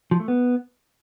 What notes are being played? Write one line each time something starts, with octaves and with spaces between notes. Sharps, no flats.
F3
A3
B3